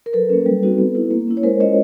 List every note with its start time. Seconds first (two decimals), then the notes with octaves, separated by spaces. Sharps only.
0.06 A#4
0.13 F#3 A4 B4
0.30 A#3 C#4
0.46 G3
0.63 C4 D#4 F#4
0.78 B3
0.95 E4
1.11 A#3
1.28 C#4 E4
1.37 C#5
1.43 G#3 A#4 C5
1.60 C#4 F4 C#5 D#5